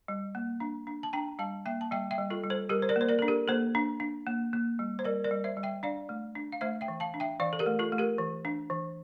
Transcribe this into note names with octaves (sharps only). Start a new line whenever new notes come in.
G3
A#3
D4
D4
A5
D4 G5 A#5
G3 F5 A5
A#3 E5 G5
A5
G3 E5 G5
E5 G5
G3
F4 A4
G3
A4 C5
G3 G4 A#4
C5
A#4 D5
A#3
C5
A#4 D5
D4 A4
G4 A#4
A#3 A4 C5
D4
D4
A#3
A#3
G3
C5
G3 A#4 D5
A#4 D5
G3
C5 E5
G3
E5 G5
D4 D5 F5
A3
D4
F5
A3 C5 E5
E5 G5
E3
F5 A5
D4
E5 G5
E3 D5 F5
A4
G4 A#4
A3
F4 A4
A3
G4 A#4
E3
D4
E3